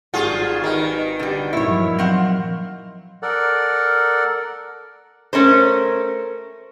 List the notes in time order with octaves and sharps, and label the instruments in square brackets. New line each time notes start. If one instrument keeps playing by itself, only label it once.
[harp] G#1 D#7 [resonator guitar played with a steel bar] G3 F#4 [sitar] F4 G#4
[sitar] D#3 [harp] B4 A#5
[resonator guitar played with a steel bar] D3 G3
[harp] G2 A#2 A#3 [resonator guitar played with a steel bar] E4 C#5
[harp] F3 F#3
[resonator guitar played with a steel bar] C4 F5 F#5
[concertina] A4 A#4 D5 F#5
[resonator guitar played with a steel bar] A3 C#4 A#4 C5